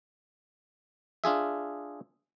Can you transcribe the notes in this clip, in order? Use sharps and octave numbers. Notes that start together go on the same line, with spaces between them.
D4 F4 G#4 E5